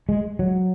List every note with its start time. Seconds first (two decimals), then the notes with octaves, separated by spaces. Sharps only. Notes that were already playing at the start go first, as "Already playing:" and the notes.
0.09 G#3
0.39 F#3